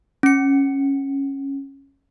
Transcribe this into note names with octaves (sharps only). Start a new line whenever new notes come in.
C#4 C#7